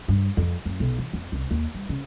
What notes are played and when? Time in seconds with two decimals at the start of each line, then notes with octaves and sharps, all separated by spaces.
0.08 G2
0.37 F2
0.66 F#2
0.80 B1
0.99 E3
1.13 F2
1.32 C2
1.51 D#2
1.75 G3
1.89 C#3